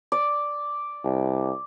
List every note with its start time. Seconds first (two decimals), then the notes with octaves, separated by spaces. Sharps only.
0.12 D5
1.04 C2